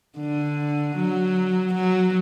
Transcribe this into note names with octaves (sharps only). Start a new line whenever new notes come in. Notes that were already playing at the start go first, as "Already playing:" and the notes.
D3
F#3
F#3